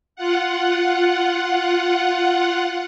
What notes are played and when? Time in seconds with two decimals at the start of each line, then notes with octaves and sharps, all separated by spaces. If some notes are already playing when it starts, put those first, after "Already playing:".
0.16 F4 F#5